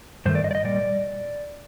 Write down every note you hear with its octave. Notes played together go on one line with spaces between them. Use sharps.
G2 D#3 A3 C5
D5
D#5
D5
D#5
A#2 G3 D5